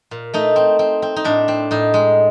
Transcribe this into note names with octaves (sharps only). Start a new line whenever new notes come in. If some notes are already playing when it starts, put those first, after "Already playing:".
A#2
A3 D#4
C4
C4
C4
D#4
A2 D4
C4
A2 D#4
G#3